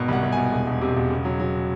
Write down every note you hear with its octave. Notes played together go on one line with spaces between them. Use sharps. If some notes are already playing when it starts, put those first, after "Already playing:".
Already playing: G#1 B2
C2 F#5
C2
B2 G#5
E1
E1
C3
E1
C#3
F#3
F#3